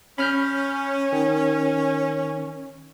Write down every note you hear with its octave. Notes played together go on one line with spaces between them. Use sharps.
C#4 B5 F6 G6
D#3